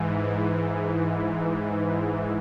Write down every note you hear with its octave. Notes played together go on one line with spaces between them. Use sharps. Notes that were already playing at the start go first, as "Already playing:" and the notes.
Already playing: G#2 E3